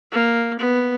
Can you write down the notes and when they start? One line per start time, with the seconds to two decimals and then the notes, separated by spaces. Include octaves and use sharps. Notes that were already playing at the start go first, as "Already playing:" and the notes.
0.12 A#3
0.59 B3